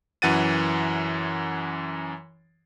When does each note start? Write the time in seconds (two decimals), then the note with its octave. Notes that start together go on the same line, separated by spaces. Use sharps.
0.22 F#2 E3 F#5 A6 D#7